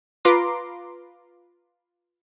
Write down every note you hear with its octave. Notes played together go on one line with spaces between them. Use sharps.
F4 B4 A#5 C6 D6